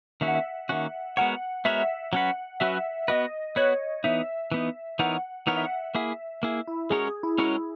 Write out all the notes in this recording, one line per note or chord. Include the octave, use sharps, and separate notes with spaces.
D#3 A#3 C#4 F#4 E5
F#5
E5
D#3 A#3 C#4 F#4 F#5
G#3 B3 F#4 A#4 C#5 F#5
G#3 B3 F#4 A#4 C#5 E5
F#3 C#4 F#4 B4 F#5
F#3 C#4 F#4 B4 E5
B3 F#4 B4 D#5
B3 F#4 B4 C#5
E3 B3 D#4 E5
E3 B3 D#4
E3 B3 D#4 A#4 C#5 F#5
E3 B3 D#4 A#4 C#5 F#5
E5
F#5
A#3 E4 G#4 E5
A#3 E4 G#4
E4
G#3 C#4 F#4 G#4 A#4 C#5
G#4
E4
G#3 C#4 F#4 A#4 C#5